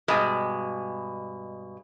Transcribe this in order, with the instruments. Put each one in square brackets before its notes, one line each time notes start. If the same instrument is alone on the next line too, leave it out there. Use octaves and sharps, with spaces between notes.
[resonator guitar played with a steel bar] G2 B2 G#3